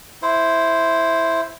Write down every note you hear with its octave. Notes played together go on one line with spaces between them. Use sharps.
E4 C5